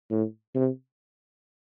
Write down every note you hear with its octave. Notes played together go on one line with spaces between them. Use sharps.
A2
C3